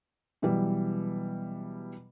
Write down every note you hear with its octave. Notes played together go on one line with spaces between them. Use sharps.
B2 E3 F#3 G3